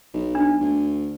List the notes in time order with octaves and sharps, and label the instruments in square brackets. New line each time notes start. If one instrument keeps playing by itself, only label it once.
[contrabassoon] B1
[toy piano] D4
[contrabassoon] D2